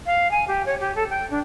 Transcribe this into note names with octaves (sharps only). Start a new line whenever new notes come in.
F5
G#5
G4
C#5
G4
A4
G5
D4